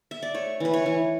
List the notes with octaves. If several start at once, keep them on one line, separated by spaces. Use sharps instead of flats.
E5
D5
A3 C#5
E3 B4
C#5
E3